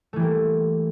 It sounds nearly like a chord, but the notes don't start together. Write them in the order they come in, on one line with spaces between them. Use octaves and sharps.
A3 E3 G3 A#3